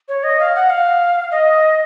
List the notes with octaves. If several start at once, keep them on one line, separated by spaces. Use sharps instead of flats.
C#5
D#5
F5
F#5
F5
D#5